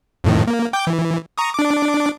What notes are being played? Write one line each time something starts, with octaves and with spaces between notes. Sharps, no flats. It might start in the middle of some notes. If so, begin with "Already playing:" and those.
F2 A2 D#3
A#3
G5 D6 G6
E3
A#5 C#6 D#6
D4 D6